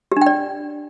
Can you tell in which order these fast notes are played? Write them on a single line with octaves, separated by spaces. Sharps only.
G4 D4 G5 D5